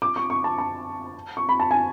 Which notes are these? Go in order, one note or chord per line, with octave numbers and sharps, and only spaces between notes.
D6
C#6
C#6
A5
A5
C#6
B5
A5
G#5